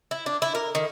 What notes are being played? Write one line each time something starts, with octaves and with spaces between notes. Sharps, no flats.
E4
D4
E4
A#4
D#3